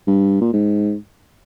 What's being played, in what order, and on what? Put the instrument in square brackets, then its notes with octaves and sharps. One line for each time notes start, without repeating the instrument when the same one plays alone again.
[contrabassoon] G2
A#2
G#2